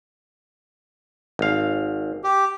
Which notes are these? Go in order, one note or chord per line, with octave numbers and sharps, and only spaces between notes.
G#1 F5
G4